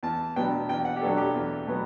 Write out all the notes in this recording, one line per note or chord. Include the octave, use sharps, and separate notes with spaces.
E2 A5
B2 F#3 B3 D4 G5
E2 G5
F#5
G4
B2 F#3 B3 D4 A4
G4
E2
B2 F#3 B3